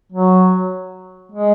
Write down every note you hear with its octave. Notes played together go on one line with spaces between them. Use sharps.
F#3
G#3